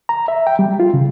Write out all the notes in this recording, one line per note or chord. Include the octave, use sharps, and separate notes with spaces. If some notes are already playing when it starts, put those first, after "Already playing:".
A#5
E5
G5
G3
F4
C#3